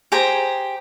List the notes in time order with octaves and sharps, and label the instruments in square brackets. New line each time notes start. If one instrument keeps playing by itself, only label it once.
[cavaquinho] G4 G#4 C5 A#5